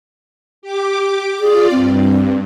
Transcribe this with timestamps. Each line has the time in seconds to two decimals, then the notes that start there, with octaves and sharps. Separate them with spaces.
0.62 G4 D6
1.40 F4 G#4 D5
1.72 G2 C4